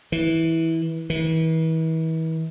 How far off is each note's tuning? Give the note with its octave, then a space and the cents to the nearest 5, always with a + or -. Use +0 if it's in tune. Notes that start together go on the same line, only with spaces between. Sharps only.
E3 -15
E3 -40